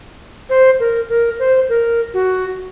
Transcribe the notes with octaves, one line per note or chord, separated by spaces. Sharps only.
C5
A#4
A#4
C5
A#4
F#4